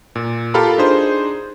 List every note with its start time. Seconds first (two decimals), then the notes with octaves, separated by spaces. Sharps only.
0.15 A#2
0.54 F4 G4 A4 A#4 F5 B5
0.78 D4 D#4 G#4 C5